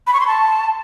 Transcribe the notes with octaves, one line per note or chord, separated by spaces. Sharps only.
B5
C#6
C6
A5